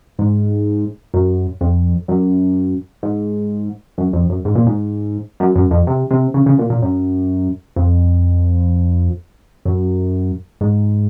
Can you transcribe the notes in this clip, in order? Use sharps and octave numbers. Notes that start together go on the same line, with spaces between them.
G#2
F#2
F2
F#2
G#2
F#2
F2
F#2
G#2
A#2
G#2
F#2
F#2
F2
C3
C3
C#3
C#3
A#2
A#2
F#2
F2
F#2
G#2